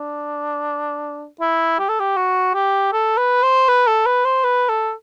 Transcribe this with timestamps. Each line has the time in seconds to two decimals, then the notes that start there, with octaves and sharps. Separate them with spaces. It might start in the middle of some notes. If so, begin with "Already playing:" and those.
Already playing: D4
1.40 E4
1.79 G4
1.89 A4
2.00 G4
2.17 F#4
2.55 G4
2.93 A4
3.17 B4
3.43 C5
3.68 B4
3.88 A4
4.06 B4
4.25 C5
4.44 B4
4.69 A4